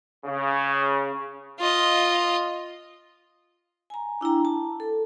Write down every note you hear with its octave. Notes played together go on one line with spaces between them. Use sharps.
C#3
F4 D#5
G#5 A#5
D4 E4 G5 A#5
A5
A4